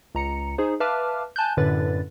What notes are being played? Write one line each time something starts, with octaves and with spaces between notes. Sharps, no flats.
C#2 A#5 C#7
D#4 G#4 C5
B4 E5 F5 A5 D6 F6
G#5 A5 F#6 G6
F#2 A2 D3 B4 A6